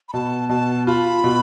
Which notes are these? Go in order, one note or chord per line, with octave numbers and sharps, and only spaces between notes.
B5
B2 A5
B2 A5
F4 B5
B2